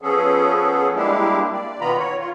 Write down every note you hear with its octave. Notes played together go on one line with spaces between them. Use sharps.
F3 B3 C#4 G#4 A4
G3 G#3 A#3 D4 E4 G4
D5
B2 D#3 B3 F4 A#5 B5
C#5
F4